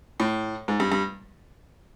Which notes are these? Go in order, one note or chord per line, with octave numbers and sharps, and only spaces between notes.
A2
G#2
G2
G2